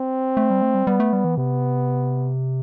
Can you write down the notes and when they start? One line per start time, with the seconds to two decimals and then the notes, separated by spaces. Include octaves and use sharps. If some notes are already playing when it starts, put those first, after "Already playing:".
Already playing: C4
0.37 A3
0.50 G3
0.62 A3
0.75 G3
0.87 G3 B3
1.00 A3
1.13 G3
1.24 E3
1.37 C3 B3